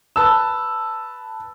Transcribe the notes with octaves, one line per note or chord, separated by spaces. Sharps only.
B4 A5 E6